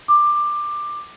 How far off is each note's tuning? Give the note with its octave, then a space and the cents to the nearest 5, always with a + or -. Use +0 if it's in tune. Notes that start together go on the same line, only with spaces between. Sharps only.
D6 +15